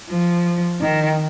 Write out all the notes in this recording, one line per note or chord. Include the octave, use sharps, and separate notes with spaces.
F3
D#3